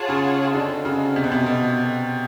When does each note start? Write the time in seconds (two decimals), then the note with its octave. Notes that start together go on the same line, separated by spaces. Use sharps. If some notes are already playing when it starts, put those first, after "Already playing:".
Already playing: F4 G#4 C#5 F#5 A5
0.09 C#3
0.55 D3 C4 D#4 F#4 A4
0.85 C#3
1.16 C3
1.24 B2
1.32 C3
1.46 B2